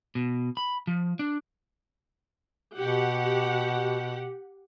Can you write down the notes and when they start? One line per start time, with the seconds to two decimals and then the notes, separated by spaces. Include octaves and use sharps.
0.15 B2
0.57 B5
0.87 F3
1.19 D4
2.78 B2 G4 F#5